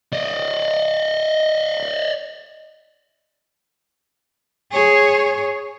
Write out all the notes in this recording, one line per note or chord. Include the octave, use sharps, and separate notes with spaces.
D5 D#5
G#4 C#5